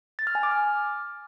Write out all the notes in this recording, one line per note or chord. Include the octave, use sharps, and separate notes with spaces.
A6
F6
G#5
D6
F6